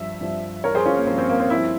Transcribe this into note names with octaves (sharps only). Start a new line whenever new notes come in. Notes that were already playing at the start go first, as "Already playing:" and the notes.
Already playing: G2 F3 E5
G2 F3
G2 F3 A#4 C#5
G#4 C5
C#4 F4
A#3
G2 F3 C4
C4
A#3
C4
G2 F3 C4 E4